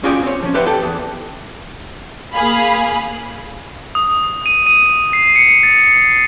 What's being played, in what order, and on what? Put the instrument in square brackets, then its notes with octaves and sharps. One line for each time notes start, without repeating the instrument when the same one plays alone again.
[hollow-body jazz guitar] C#4 F4 F#4 G#4 D5 G5
C4 C#5
F3 C#4
G4 B4 C5 E5 F#5
G4 A4
E2
[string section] A#3 G#4 F5 B5
[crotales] D#6
D#7
D#7
C7
C#7
A6